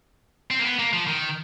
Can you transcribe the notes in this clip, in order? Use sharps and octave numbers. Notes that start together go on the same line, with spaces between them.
C4
A#3
B3
A#3
F3
D#3